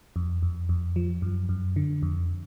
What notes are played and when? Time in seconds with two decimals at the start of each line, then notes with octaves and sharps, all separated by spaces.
0.16 F2
0.43 F2
0.69 F2
0.96 F3
1.22 F#2
1.49 F#2
1.76 D3
2.03 F2